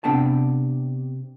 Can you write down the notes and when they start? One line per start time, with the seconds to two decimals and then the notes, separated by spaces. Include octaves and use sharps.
0.04 C3 B3 D4 G5 A5